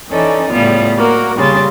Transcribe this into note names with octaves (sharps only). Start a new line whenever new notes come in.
E3 C#4 D#4 A4 D5
A2 C#3 G3 B3 F4
A#3 F#4 A#4
A#2 C#3 G3 C6 A6